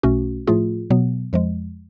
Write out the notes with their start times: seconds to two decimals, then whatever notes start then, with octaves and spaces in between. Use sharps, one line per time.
0.03 B1 B2 A3 C#4 F#4
0.47 A2 F3 A3 F4 G#4
0.90 B2 F#3 B3
1.33 F2 F3 G#3